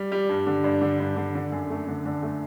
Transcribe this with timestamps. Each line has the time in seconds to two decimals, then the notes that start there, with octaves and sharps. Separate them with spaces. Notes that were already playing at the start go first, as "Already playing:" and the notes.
Already playing: G3
0.12 G3
0.29 G2
0.47 D3
0.64 G2
0.81 D3
1.00 G2
1.16 D3
1.35 D3
1.52 F#2
1.70 A3
1.88 D3
2.05 D3
2.23 A3